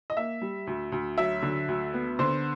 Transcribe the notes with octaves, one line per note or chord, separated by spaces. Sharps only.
D#5
A#3 E5
G3
D2
D2
F#3 E5
D3
D2
B3
D3 C5